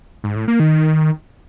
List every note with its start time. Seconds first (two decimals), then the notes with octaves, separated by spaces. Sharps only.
0.24 G#2
0.36 A2
0.48 A#3
0.60 D#3